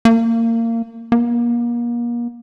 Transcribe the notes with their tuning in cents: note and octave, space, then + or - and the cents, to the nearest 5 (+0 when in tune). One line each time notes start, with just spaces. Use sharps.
A#3 -25
A#3 +35